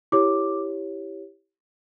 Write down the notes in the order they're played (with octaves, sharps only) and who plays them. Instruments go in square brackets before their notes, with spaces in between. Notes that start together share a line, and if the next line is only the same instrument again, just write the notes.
[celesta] E4 G4 C#5 D6